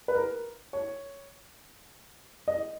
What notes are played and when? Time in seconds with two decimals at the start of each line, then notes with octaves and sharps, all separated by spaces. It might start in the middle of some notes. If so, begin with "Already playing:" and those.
0.08 B4
0.15 A#4
0.73 C#5
2.48 D#5